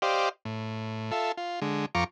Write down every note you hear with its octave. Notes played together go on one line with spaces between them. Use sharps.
G4 C5 D5 D#5 F5
A2
F4 A4 E5
F4
D3 G#3
F2 F4 A#5 C#6 D6